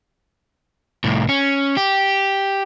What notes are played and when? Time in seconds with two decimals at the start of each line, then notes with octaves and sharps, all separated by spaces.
1.04 C2 A2
1.29 C#4
1.77 G4